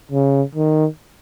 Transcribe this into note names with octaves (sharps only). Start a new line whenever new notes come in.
C#3
D#3